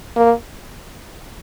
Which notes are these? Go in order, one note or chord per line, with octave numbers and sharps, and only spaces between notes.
A#3